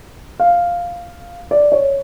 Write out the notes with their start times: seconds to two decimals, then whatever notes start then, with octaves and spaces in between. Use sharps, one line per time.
0.40 F5
1.51 D5
1.72 C#5